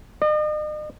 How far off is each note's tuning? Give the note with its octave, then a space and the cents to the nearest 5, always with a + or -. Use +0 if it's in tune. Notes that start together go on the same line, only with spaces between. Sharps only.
D#5 -40